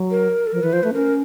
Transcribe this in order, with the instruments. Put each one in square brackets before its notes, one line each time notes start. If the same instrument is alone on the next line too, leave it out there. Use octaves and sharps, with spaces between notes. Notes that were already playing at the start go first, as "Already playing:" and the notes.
Already playing: [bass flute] F#3
[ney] A#4
A4
[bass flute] F3 [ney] A#4
[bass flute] E3 [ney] B4
[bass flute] F3 [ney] C5
[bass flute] A3 [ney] B4
[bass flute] C#4 [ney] A#4